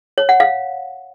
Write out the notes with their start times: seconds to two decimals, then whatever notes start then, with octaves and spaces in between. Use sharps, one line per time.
0.18 C#5
0.29 F#5
0.40 F5